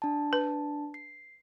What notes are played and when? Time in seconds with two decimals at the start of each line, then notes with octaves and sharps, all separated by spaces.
0.02 D4 A5
0.33 B4
0.94 C7